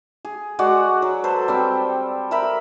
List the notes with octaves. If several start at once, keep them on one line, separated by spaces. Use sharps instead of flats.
G#4
G#3 F#4 D5 F#5
F#3
A4 B4 C5
G3 C4 G5
A#4 E5 B5